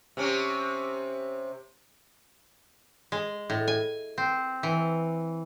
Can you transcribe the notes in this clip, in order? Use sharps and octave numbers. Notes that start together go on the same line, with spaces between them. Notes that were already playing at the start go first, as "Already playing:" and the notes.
C3 C4 C#4
G#3
A2
G#5
C4
E3